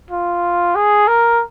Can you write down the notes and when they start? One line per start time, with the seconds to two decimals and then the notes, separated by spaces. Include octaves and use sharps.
0.11 F4
0.75 G#4
1.08 A#4